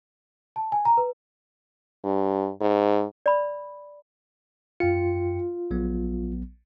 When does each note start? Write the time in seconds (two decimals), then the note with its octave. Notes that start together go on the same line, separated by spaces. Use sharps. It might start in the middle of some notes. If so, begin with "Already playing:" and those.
0.56 A5
0.72 G#5
0.85 A#5
0.97 B4
2.04 G2
2.61 G#2
3.26 D5 B5
4.80 F#2 F4 G5 C#7
5.71 A#1 F#3 B3